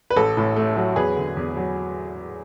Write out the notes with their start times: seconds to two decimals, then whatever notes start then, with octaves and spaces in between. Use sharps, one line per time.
0.10 B4
0.16 A1 A4
0.37 A2
0.56 A3
0.76 F#3
0.96 E2 G#4 B4
1.16 D3
1.37 E2
1.57 F#3